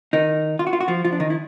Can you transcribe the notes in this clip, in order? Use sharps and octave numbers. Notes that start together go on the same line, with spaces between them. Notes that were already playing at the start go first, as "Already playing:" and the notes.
D#3 D#4
F4
F#4
F4
F#4
F3 F4
F3 F4
D4
D#3 D#4
E4